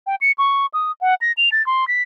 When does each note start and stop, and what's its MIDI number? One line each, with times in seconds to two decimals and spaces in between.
0.07 0.16 79
0.21 0.32 97
0.38 0.66 85
0.74 0.92 87
1.01 1.15 78
1.21 1.32 94
1.37 1.49 101
1.52 1.65 93
1.66 1.87 84
1.88 2.02 95